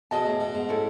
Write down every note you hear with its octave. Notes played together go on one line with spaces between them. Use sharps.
B2 G#4 D#5 A5
A2
B2
G#2
C#4 E4 A4